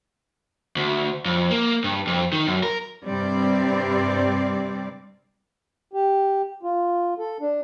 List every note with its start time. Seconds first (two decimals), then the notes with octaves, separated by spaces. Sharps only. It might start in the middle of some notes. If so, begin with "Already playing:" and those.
0.76 D2
1.25 F2
1.51 A#3
1.84 G2
2.07 F2
2.32 D#3
2.47 F#2
2.63 A#4
3.05 G2 C3 G3 C4 D5
5.93 G4
6.63 F4
7.19 A4
7.40 D4